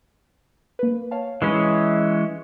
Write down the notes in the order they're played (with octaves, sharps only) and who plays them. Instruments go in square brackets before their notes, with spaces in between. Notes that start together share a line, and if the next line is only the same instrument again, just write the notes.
[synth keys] A#3 B4
C#5 F5 A5
[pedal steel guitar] E3 G#3 C#4 [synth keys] E5 B5 C7